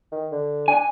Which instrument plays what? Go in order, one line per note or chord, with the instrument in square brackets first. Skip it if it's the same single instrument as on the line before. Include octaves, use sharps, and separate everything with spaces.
[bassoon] D#3
D3
[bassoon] D4 [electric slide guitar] G#5